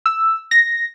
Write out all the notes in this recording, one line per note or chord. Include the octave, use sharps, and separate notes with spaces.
E6
A#6